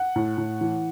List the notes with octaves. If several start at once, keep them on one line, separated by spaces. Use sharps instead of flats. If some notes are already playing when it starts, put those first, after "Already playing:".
Already playing: F#5
A2
A2
E3